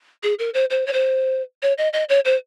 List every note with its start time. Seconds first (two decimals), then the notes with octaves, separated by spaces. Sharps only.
0.23 G#4
0.39 A#4
0.54 C5
0.70 C5
0.87 C#5
0.93 C5
1.63 C#5
1.78 D#5
1.93 D#5
2.09 C#5
2.25 C5